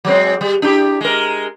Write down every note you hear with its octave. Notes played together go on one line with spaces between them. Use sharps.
F#3 G#3 C4
G3
D4 E4 G4
G#3 A#4